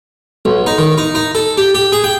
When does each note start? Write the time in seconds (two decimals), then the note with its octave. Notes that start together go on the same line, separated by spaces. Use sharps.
0.45 B1
0.66 D#4
0.78 D#3
0.98 D#4
1.15 D#4
1.35 A4
1.57 G4
1.75 G4
1.92 G#4
2.04 G5